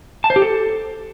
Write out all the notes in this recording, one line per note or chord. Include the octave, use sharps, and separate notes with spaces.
A5
C5
G4
A4